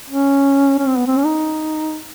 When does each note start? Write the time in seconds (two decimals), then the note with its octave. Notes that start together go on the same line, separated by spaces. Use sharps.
0.10 C#4
0.79 C#4
0.87 C4
0.97 B3
1.07 C4
1.17 C#4
1.26 D#4